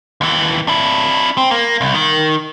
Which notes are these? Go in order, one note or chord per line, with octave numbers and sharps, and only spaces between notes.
D#2 E3
D4 E4
C4
A#3
C2
D#3